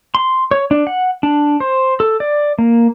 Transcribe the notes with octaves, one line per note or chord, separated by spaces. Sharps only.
C6
C#5
D4
F#5
D4
C5
A4
D5
A#3